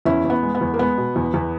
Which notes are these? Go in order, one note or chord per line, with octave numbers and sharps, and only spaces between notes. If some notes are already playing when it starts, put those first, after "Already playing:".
E2 C#4 E4
E2
B3
G#3
B3
E2
A#3
G#3 B3
B2
E2
E2